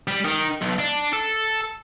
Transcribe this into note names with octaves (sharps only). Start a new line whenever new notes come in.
G3
D#3
B1
D4
A4